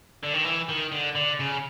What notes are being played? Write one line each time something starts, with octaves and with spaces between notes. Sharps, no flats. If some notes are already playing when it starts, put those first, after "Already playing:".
D3
D#3
E3
D#3
D3
D3
C#3